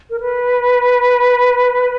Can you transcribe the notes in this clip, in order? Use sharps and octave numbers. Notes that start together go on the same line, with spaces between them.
A#4
B4